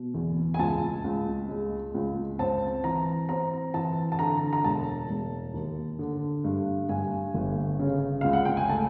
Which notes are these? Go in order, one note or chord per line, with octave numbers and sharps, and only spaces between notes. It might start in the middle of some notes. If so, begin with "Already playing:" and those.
Already playing: B2
E2
G#5
C#2 A5
C#2
G#3
C#2
C4 A5
E3 A#5
C4 A#5
E3 A5
A5
D3 A#5
A#5
E1 A5
E1
D#2
D3
G2
G2 G#5
G1
C#3
C#2 F5
F#5
G5
G#5
A3 A5